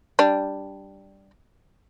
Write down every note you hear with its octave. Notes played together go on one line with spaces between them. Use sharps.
G3 D4